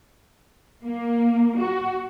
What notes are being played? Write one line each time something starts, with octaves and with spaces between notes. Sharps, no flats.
A#3
F#4